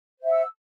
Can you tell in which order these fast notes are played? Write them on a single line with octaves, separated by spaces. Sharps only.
C5 E5 F#5 E6